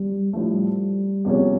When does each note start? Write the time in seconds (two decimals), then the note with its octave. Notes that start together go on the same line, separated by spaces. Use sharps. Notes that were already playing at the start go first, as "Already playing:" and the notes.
Already playing: G3
0.33 A2 F3 G3 A3
1.25 E2 C3 F3 A#3 C#4